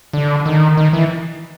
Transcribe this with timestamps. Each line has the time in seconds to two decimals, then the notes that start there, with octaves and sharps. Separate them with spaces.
0.13 D3
0.46 D#3
0.77 D#3
0.93 E3